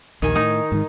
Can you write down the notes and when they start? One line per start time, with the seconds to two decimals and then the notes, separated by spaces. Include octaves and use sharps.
0.22 A#1 D#2 D#3 G#5
0.36 A2 D#4
0.72 G#2 D#3